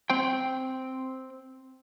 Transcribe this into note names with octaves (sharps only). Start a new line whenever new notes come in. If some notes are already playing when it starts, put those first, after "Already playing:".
C4 C5 G5